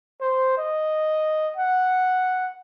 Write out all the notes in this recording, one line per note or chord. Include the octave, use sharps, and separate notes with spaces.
C5
D#5
F#5